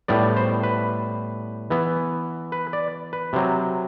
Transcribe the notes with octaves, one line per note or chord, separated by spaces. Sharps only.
A2 G3 B3 D5
C5
B4
E3 B3
B4
D5
B4
C3 F#3 C4